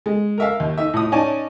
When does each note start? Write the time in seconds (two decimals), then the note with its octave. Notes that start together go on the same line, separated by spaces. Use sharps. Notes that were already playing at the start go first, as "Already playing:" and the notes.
0.06 G#3
0.38 A#4 E5 F5
0.60 D#2
0.78 D#4 E5
0.94 A2 D#6
1.12 C#4 D#4 D5 D#5 G#5 A5